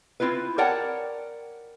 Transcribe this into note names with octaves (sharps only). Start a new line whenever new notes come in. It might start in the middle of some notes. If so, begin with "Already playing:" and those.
C4 E4 F4 B4
A#4 C#5 D5 F#5 G5 A5